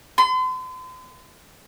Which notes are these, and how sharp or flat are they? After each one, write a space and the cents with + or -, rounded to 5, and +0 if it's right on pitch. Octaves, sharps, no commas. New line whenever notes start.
C6 -40